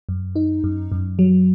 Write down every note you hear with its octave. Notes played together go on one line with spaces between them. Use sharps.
F#2
D#4
F#2
F#2
F#3